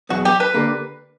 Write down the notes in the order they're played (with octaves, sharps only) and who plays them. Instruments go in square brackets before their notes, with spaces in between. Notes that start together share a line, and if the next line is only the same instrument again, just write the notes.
[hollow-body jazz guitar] E2 B2 F#3 B3 [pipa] F#4
[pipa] G4
B4
[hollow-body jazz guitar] D3 A#3 D4 G4 A#4